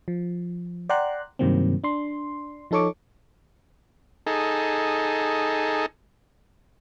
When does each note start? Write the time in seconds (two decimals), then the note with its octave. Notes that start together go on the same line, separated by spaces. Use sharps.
0.08 F3
0.89 D5 F#5 G5 A#5 C6 F#6
1.39 G2 C3 D#3 F#3 A#3 C4
1.84 D4 C6
2.71 F3 D#4 A4 C#5 C#6 D6
4.27 D#4 G#4 A4